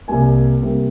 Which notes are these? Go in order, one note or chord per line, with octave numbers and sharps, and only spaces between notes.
C2 C3 G3 A#3 G#5
C3 G3 A#3